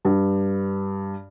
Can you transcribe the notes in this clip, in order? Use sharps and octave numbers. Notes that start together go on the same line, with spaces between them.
G2